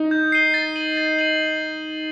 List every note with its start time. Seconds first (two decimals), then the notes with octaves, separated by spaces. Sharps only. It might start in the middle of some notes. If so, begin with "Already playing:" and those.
Already playing: D#4
0.11 G6
0.32 C7 D#7 G7
0.54 A6
0.76 D#7 F#7
0.97 A6
1.19 D#7 F#7